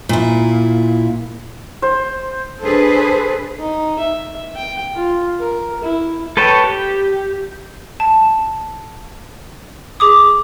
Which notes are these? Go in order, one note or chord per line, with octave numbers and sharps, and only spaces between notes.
A#2 E4
C5
D4 G#4 A4 B4 C5
D#4
E5
G5
F4
A#4
E4
A4 B4 C#5 G5 A5
G4
A5
G#4 D6 D#6